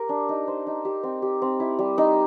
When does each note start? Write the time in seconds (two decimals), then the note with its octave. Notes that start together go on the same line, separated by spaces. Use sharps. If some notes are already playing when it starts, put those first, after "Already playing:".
Already playing: G4 A#4
0.09 D4
0.29 D#4
0.48 C5
0.67 D#4
0.85 G4
1.03 C4
1.22 G4
1.42 C4
1.60 E4
1.79 G3
1.98 D#4